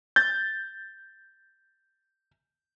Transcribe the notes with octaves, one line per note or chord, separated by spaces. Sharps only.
G6 A6